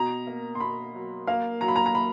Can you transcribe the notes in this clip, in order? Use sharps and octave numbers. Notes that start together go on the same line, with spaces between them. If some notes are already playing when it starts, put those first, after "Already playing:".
Already playing: B2 A#5
A#3
C6
B2 B5
F#3
A#3 F5
F#3 A#5
B5
A#5
A#5
B5